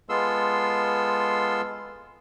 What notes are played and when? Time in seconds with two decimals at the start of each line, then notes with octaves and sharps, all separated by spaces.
0.09 G#3 B3 F4 A4 C6 E6